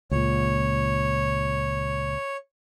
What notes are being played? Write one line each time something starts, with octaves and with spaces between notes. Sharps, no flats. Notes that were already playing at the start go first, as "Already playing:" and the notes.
C#2 A#2 C#5